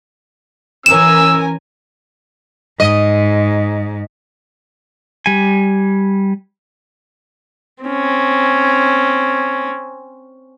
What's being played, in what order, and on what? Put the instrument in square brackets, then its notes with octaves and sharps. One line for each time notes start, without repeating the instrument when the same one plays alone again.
[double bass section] E3 [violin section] C#4 A#4 G#5 [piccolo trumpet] E6 [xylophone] E7
[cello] G#2 [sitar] D#5
[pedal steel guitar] G3 G#5
[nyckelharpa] C4 C#4